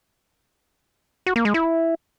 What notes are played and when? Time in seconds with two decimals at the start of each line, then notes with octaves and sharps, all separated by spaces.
1.26 F#4
1.36 A#3
1.45 G#3
1.54 E4